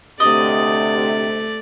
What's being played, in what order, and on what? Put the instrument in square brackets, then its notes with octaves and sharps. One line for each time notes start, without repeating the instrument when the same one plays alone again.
[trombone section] D2 C3 [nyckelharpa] A3 D5 [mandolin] D#5